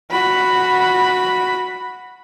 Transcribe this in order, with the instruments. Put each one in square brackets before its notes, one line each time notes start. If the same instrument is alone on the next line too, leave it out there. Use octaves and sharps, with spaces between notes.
[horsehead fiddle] F#4 B5